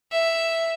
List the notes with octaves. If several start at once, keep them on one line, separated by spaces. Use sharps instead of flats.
E5